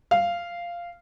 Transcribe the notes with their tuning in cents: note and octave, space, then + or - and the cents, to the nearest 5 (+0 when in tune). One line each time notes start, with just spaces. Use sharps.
F5 -10